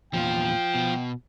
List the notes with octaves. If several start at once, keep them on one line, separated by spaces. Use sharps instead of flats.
E2 A#2 F3 F4 G5
B2